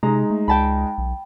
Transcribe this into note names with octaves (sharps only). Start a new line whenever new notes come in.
C3 G#3 D#4 A#5
A3
C#2 G5 A5 B5
B1